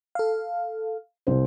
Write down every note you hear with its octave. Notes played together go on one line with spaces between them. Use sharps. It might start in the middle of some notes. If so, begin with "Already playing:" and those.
A4 F5
C2 C5